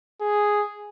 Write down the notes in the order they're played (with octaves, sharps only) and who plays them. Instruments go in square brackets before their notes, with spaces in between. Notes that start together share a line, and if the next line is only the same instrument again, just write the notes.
[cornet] G#4